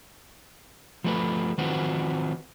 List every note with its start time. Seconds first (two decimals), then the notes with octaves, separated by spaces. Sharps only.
1.04 F3 A3 B4
1.58 D#3 F3 C4 F#4 B4